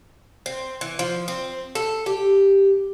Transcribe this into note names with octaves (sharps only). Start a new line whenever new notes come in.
C4
E3
F3
C4
A4
G4